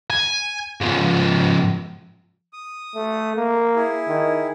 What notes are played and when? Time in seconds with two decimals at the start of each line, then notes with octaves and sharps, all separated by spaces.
0.10 G#5
0.81 G#2 F3
2.53 D#6
2.95 A3
3.36 A#3
3.75 E4 G#4
4.08 D#3